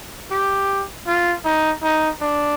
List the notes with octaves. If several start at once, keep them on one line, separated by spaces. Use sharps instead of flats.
G4
F4
D#4
D#4
D4